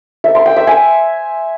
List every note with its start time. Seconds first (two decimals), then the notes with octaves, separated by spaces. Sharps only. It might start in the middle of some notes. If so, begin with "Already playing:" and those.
0.24 E5
0.35 C6
0.46 G5
0.56 E5
0.67 G#5